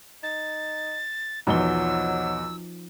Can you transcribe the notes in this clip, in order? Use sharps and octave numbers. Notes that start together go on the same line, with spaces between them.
D#4 A6
B1 E2 F3 F#3 D#4 E6 G7